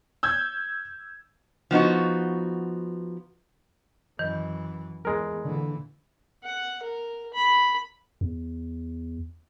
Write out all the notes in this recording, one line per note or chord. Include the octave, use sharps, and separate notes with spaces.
E6 G6 G#6
F3 B3 D#4 F#4
F#2 D#3 E3
E2 G#3 A#4
A#2 D3 E3
F#5
A#4
B5
E2